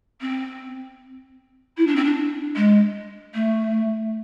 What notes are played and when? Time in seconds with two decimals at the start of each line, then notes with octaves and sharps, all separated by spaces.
0.21 C4
1.77 E4
1.87 D4
1.95 C4
2.04 D4
2.55 G#3
3.34 A3